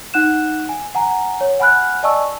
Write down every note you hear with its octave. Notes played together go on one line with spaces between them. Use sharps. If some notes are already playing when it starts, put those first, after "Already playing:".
D#4 F#5 F#6 E7
G#5
F#5 G#5 A#5
C#5
F#5 G#5 B5 F6 F#6
D5 D#5 G#5 A5 C#6 E6